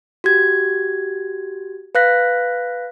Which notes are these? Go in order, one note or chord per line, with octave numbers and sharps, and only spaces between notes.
F#4 G4 G#6
B4 F5 F#6 A#6 B6